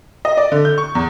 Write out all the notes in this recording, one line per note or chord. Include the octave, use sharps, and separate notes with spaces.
D#5
D5
D3
G6
C#6
E2